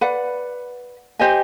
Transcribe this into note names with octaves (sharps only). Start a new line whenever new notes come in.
B4 D5 F#5
G4 C5 D#5 G#5